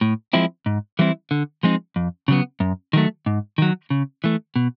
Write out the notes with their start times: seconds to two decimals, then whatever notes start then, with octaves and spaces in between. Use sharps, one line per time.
0.01 A2
0.33 F3 G#3 C4 E4
0.66 G#2
0.99 E3 G3 C4 E4
1.31 D3
1.63 F3 G#3 C4 D#4
1.96 F2
2.28 C#3 F#3 B3
2.60 F#2
2.93 D#3 F#3 A3
3.26 G#2
3.58 D#3 F#3
3.90 C#3
4.24 E3 A3
4.56 B2